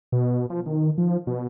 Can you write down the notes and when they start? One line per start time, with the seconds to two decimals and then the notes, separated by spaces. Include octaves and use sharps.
0.12 B2
0.50 F3
0.66 D#3
0.98 F3
1.27 B2